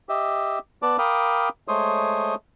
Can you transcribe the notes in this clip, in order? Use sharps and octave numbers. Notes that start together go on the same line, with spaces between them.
G4 D#5 E5
B3 B4 D5 A5 D6
A#4 F5 G5 B5 D6 D#6
G#3 A3 C5 C#5 C6 D#6